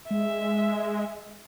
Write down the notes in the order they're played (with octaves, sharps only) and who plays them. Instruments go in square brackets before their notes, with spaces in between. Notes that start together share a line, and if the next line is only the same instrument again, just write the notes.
[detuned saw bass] G#3 [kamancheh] E5